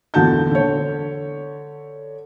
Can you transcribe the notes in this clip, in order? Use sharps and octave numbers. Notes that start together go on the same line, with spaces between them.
E2 A#2 D3 F#4 A5 G6
D3 C#5